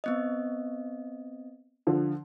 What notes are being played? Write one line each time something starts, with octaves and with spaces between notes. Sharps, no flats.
B3 C4 D#5
D3 F3